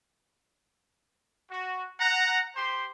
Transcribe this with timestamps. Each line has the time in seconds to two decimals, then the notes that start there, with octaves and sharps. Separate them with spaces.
1.50 F#4
2.00 F#5 A#5
2.56 G4 C5 C6